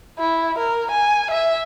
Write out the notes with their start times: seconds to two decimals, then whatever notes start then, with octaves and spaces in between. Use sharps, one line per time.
0.19 E4
0.59 A#4
0.91 G#5
1.31 E5